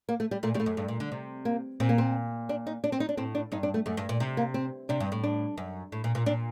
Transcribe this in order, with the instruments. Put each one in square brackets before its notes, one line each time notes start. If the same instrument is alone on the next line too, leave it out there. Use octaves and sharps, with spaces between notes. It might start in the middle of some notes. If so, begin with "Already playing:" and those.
[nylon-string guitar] A#3
A3
G3
[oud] A#2 [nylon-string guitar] A3
[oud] A2 [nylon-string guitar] G3
[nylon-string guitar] A3
[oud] F#2
G2
A#2
D3
C3
[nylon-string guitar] A#3
[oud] A#2 [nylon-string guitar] C4
[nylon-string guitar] A#3
C4
D4
D#4
D4
C4
D#4
D4
[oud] A2 [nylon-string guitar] C4
[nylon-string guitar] D4
[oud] G2 [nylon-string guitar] D#4
[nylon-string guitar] D4
A3
[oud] F#2 [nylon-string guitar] A3
[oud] G2
A#2
C3
[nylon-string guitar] A#3
C4
[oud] C3 [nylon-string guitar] D4
[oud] G2
A2
[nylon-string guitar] D4
[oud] F#2
A2
A#2
A#2
[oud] A#2 [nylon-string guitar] D4